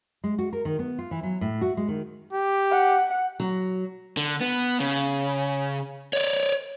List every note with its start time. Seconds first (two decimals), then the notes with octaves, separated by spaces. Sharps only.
0.24 G#3
0.39 F#4
0.53 A#4
0.65 D#3
0.79 B3
0.99 F4
1.11 E3
1.23 F#3
1.41 A2
1.61 F#4
1.77 G#3
1.88 D#3
2.33 G4
2.71 F#5
3.40 F#3
4.17 D3
4.41 B3
4.80 C#3
6.13 C#5 D5